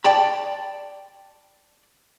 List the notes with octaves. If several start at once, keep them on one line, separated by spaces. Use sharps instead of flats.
D5 G5 A5 B5